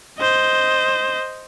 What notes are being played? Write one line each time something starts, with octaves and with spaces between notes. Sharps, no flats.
C5 D#5